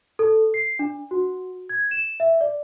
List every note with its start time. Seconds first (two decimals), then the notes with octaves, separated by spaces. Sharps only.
0.19 A4
0.54 C7
0.79 D4
1.11 F#4
1.69 G#6
1.91 E7
2.20 E5
2.41 D5